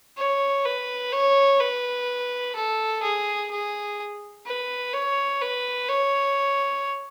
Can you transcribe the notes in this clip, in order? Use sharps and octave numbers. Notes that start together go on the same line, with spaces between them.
C#5
B4
C#5
B4
A4
G#4
G#4
B4
C#5
B4
C#5